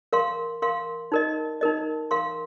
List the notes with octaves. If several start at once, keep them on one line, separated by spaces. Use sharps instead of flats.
A#4 F5 C6
A#4 F5 C6
D#4 A#4 D#5
D#4 A#4 D#5
A#4 F5 C6